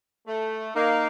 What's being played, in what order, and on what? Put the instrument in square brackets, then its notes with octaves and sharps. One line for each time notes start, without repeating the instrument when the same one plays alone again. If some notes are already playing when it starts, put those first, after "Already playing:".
[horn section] A3
[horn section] A#3 [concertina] D#4 A#4 F5